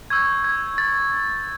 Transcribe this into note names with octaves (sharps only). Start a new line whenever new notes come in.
C#6 E6 G6 G#6
G#6
A6